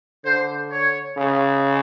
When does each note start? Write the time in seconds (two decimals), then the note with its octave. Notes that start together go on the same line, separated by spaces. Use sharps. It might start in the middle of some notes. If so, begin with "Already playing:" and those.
0.25 D3 C5
0.71 C#5
1.17 C#3